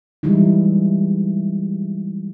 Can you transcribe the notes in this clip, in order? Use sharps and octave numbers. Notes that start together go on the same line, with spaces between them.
E3 G3 G#3 D#4 E4